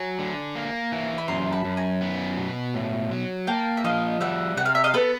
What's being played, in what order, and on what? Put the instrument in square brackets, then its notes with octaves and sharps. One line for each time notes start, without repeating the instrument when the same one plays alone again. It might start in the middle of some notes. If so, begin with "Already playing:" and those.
Already playing: [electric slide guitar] F#3 [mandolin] G#5 A#5
[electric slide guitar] D3
A#3
E3
[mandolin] B5
[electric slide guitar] F#2 [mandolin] A#5 C6
[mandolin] A5 B5
[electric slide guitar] F#2
[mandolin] G#5 A#5
[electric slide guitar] B3
B2
A2
F#3
[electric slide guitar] A#3 [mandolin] G5 A5
[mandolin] E5
[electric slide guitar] F3 [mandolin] D#5 F5
[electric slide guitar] G3 [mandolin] E5 F#5
[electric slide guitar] C3 [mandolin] F#5
[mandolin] F5
E5
D#5 F5
[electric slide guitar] B3 [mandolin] A4 B4